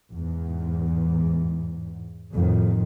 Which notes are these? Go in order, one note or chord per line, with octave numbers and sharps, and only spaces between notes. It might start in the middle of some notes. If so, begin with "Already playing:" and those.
E2 G#2
F2 A2 D#3